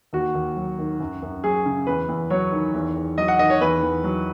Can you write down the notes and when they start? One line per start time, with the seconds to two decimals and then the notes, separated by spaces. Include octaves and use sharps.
0.13 D#2 F#4
0.35 D#2
0.56 F#3
0.78 D#3
1.00 F#2
1.22 F#2
1.44 F#3 G#4
1.66 C#3
1.87 E2 B4
2.08 E2
2.30 F#3 C#5
2.52 D#3
2.74 E2
2.96 E2
3.18 F#3 D#5
3.28 F#5
3.39 D#3 D#5
3.50 C#5
3.60 E2 B4
3.82 E2
4.04 F#3